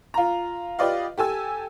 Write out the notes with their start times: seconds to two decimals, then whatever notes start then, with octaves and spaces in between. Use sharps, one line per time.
0.14 F4 A#5
0.79 F4 G4 B4 D5 D#5 F5
1.18 G4 A4 G#5 E6